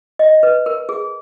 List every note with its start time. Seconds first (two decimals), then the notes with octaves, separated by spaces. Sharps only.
0.19 D#5
0.43 B4
0.66 A#4
0.89 G#4